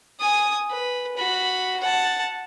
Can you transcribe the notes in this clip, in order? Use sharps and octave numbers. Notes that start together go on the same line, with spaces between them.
G#5 D#6
B4
F#4 B5
F#5 A5